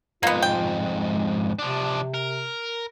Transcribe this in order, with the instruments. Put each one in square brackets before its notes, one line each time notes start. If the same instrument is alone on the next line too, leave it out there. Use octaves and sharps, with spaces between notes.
[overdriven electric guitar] F2 G#2 [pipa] A#3 B3 [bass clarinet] F4
[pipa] G5
[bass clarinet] G#3
[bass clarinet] C3 [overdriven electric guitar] F3 D4
[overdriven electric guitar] A#4